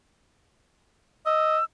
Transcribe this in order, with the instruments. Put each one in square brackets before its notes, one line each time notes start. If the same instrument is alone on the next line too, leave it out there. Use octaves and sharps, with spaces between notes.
[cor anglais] D#5 [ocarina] E6